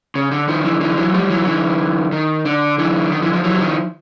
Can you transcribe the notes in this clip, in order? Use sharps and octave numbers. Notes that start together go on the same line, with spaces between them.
C#3
D3
D#3 F3
D3 E3
D3 E3
E3 F#3
F3 G3
E3 F#3
D3 E3
D#3
D3
D3 E3
D#3
E3
F3
E3 F#3
E3
D#3 F3